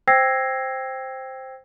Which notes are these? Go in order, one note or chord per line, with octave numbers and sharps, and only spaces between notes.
C5 G5 E6 G#6 A#6 C7